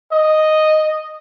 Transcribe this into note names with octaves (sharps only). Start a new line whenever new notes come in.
D#5